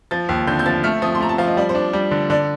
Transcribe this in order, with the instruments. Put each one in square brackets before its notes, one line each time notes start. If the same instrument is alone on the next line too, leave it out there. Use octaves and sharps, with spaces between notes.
[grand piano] F3 [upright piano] A6
[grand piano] D#2
[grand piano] D3 [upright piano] G6
[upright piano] G6
[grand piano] F3 [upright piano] A6
[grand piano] A3 [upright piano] F6
[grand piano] F3 [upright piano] D#6
[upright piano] C6
[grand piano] A3 [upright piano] A#5
[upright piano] A5
[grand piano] F3 [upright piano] F5
[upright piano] D#5
[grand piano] G3 [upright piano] D5
[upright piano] C5
[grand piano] D4
G3
D3
[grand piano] D3 [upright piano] D5